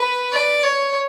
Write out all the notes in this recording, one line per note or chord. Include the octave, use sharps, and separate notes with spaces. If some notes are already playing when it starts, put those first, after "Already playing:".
Already playing: B4
D5
C#5